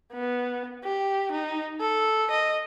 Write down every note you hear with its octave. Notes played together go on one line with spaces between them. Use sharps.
B3
G4
D#4
A4
D#5